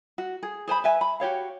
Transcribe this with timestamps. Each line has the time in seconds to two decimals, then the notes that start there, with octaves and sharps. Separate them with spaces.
0.18 F#4
0.43 G#4
0.68 G#4 C5 G#5 B5
0.84 B4 E5 G#5
1.01 B5
1.20 F#4 G4 C#5 F5